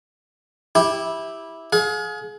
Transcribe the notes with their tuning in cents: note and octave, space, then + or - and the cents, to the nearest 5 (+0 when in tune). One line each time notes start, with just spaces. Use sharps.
E4 -10 G4 +5
G#4 +30 F5 +40